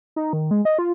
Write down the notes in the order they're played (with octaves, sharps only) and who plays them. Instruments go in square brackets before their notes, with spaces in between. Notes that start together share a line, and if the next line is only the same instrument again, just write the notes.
[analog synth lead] D#4
D#3
G#3
D#5
F4